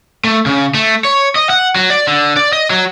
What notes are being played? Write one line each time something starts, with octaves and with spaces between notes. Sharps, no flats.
A3
C#3
A3
C#5
D#5
F#5
F#3
D5
D3
D5
D#5
F#3